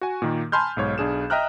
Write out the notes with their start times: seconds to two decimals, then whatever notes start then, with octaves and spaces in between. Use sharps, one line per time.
0.01 F#4 G#5
0.22 A#2 D#3 A#3
0.52 G#5 A5 B5 C6 F6 G6
0.77 B1 G#2 C#5
0.98 B1 D4 G#4 E7
1.30 D#5 E5 G5 A#5 F6 F#6